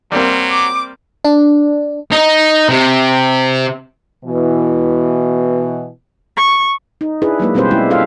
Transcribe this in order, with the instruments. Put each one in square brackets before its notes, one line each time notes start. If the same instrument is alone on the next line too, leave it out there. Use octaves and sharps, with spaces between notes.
[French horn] F#3 [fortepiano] G3 A#3 C4
[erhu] D6
[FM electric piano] D4
[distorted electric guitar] D#4
C3
[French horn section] B2 E3
[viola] C#6
[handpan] D#4
D4 E4 G#4 B4
F#3 G#3 A#3 B4
B2 G3 C4 G4 B4 C5
G#3 C#4 E4 G4
F4 A4 E5 F5